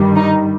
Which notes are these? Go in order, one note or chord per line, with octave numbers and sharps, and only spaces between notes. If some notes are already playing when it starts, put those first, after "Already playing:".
Already playing: G2 D#3 G3
D#4